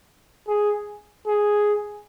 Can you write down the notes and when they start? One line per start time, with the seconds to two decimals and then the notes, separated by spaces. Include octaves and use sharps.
0.48 G#4
1.28 G#4